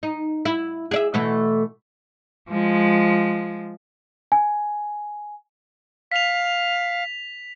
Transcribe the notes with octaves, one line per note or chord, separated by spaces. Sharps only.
D#4
E4
G#4 D5 E5
B2 E3 A3
F3 G#3
G#5
F5 B6 F7